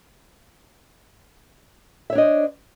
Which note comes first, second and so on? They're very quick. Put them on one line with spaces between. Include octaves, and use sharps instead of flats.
E5 C#5 D4 D#5 C5